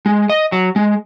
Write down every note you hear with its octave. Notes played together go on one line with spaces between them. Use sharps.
G#3
D#5
F#3
G#3